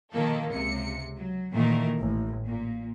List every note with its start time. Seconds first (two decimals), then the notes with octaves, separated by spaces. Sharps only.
0.12 B2 D#3 F3 A#3 A4
0.49 C#2 C3 C#7
1.16 F#3
1.52 A#2 D#3 E3 A3 A#4
1.99 A1
2.46 A#2